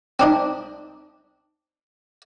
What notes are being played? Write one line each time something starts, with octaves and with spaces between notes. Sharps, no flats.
C4 D4 D#4